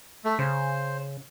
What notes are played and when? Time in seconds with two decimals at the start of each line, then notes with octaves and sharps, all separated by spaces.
0.25 A3
0.39 C#3 C5